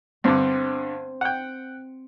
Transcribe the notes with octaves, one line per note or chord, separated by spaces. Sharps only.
G2 D3 C4
F#5 G5